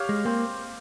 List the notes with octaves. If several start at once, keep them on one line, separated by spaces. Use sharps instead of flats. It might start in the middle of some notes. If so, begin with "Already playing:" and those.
Already playing: G4 C#5 F5
G#3
A#3 C4